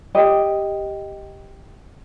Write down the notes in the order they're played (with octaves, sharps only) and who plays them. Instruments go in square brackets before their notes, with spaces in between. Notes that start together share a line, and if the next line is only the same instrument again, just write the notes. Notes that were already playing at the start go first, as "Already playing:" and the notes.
[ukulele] G4 D#5